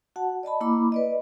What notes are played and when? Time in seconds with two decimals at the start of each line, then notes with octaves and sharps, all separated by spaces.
0.16 F#4 F#5 A5
0.43 D5 D#5 A5 B5
0.61 A#3 E4 B5 D6
0.92 B4 D5 D#5